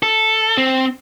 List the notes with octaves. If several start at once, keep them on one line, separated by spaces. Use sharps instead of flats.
A4
C4